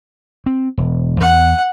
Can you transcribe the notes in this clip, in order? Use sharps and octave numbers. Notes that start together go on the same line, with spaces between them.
C4
E1
E2 F#5